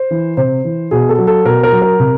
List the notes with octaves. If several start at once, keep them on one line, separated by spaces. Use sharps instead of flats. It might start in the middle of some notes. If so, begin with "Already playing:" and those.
Already playing: C5
E3
C3 C5
E3
B2 G#4
A4
F#3
A4
B2 A#4
A#4
F#3
A#4
C3